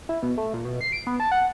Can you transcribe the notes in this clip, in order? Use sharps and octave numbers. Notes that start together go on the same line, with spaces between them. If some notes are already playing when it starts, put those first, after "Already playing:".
E4
B2
A3
A#2
B2
C7
D7
B3
A5
F#5